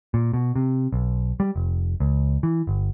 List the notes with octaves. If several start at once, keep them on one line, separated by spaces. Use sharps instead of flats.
A#2
B2
C3
B1
G3
F1
C#2
E3
G1